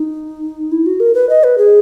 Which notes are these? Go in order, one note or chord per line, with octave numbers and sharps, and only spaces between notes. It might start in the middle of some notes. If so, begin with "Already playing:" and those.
Already playing: D#4
E4
F#4
A#4
B4
D#5
B4
G#4